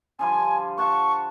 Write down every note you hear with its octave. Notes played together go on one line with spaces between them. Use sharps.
D3 F3 G3 G#5
C5 F#5 A5 C#6